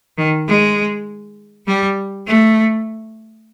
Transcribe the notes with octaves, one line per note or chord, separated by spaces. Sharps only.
D#3
G#3
G3
A3